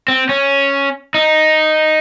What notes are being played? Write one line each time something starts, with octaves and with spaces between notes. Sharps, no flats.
C4
C#4
D#4